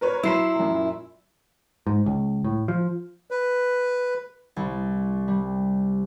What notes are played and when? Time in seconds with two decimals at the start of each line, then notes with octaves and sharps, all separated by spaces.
0.01 A#4 B4 C#5
0.23 F#3 E4 B5 C6 E6 C7 E7
0.55 F#2 A#2
1.87 G#2
2.06 C#2
2.44 A2
2.68 F3
3.31 B4
4.56 C2
5.28 G3